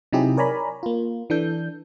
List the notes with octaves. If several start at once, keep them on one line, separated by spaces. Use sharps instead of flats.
C3 F#3 D#4 E4 G4 G#4
A#4 C#5 D5 G#5 A#5 B5
A#3 F4
E3 D4 A4 G6